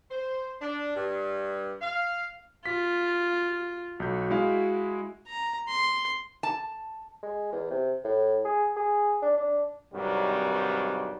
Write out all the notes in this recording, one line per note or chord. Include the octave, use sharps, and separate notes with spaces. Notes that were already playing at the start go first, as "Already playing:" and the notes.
C5
D4
G2
F5
F4 B6
B1 F#4 G6
G#3 E4 F5
A#5
C6
A5
G#3
E2
C3
A2
G#4
G#4
D4
D4
G#1 G2 C3 D#3 F#3 G3